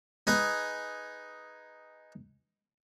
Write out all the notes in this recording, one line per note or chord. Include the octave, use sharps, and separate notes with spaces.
D#4 G#4 B4 G#5